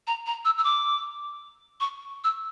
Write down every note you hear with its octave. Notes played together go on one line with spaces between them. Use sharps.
A#5
A#5
E6
E6
D6
C#6
E6